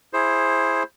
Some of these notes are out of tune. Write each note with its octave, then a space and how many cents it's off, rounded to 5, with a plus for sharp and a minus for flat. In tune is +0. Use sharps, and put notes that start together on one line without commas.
E4 +0 G#4 +0 C5 +15